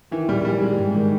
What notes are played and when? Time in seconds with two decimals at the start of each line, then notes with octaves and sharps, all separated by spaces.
0.11 D#3 E3
0.28 A#1 G3
0.45 D#3 G3
0.61 G3 G#3
0.78 G#2
0.95 D#3